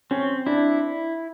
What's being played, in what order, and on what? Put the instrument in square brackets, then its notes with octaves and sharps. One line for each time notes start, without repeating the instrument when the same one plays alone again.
[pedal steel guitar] C4 [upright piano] C#4
[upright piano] D4 [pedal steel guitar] E4